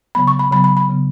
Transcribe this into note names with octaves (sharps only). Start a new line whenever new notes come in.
C#3 F#3 B3 B5
C#6
B5
C#3 F#3 B3 B5
B5
B5
C#3 F#3 B3